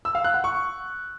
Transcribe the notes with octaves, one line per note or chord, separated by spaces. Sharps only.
E6
F5
F#6
F#5
C#6